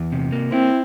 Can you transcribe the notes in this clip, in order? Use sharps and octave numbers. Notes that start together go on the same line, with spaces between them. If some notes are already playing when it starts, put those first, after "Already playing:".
Already playing: E2
C3
A#3
C4 E4